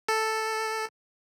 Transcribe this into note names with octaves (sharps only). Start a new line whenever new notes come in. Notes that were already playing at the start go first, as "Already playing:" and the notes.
A4